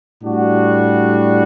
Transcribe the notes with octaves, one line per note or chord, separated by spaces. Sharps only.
A2 G3 D4 F#4